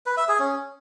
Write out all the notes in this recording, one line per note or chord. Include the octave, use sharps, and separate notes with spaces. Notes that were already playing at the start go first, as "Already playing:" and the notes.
B4
E5
G#4
C#4